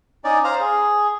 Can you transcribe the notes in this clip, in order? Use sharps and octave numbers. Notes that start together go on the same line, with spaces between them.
C#4 D#4 D5
C5 F5 A#5
G#4